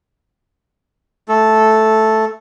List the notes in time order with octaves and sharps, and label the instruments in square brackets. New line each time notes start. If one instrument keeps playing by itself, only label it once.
[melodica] A3 A4